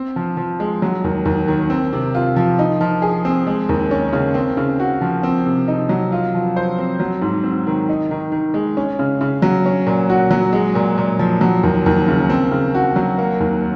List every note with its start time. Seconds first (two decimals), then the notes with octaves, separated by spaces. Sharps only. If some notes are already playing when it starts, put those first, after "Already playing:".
Already playing: C4
0.16 F3
0.37 F3
0.60 G#3
0.82 F#3
1.04 D#2
1.25 D#2
1.48 D#3
1.70 C4
1.93 C3
2.15 F4
2.36 F3
2.59 D#4
2.81 F3
3.02 G#4
3.25 C4
3.47 G#3
3.69 D#2
3.91 C#4
4.13 C#3
4.34 C4
4.57 C#3
4.80 F#4
5.01 F3
5.23 C4
5.46 C3
5.68 D#4
5.89 F#3
6.12 F4
6.34 F3
6.56 C5
6.78 C4
7.00 F#3
7.21 G#2
7.44 C4
7.67 D#3
7.89 D#4
8.11 D#3
8.32 D#3
8.54 G#3
8.77 C#4
8.99 C#3
9.21 C#3
9.42 F#3
9.66 C#4
9.87 A#2
10.10 F#4
10.31 F#3
10.53 G#3
10.75 A#2
10.98 A#2
11.19 F3
11.41 F#3
11.63 D#2
11.86 D#2
12.08 C#3
12.30 C4
12.51 C#3
12.75 F#4
12.96 F#3
13.18 A#3
13.40 D#2